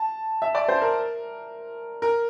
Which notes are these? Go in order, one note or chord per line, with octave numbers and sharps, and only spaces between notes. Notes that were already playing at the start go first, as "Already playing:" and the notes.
Already playing: A5
E5
D5
C5
A#4
A#4